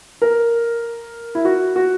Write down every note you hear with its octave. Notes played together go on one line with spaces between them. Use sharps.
A#4
E4
F#4
F#4